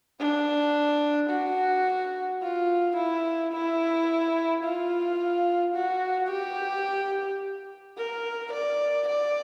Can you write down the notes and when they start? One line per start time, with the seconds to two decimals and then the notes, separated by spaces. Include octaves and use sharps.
0.19 D4
1.30 F#4
2.42 F4
2.97 E4
3.53 E4
4.63 F4
5.75 F#4
6.30 G4
7.97 A#4
8.53 D5
9.08 D5